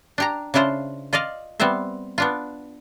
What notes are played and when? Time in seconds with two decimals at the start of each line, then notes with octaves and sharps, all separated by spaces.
0.18 D4 G4 A#5
0.54 C#3 D4 E4 F4 C5
1.13 F4 D5 D#5 F5
1.60 G3 B3 C4 C5 E5
2.18 B3 D4 F4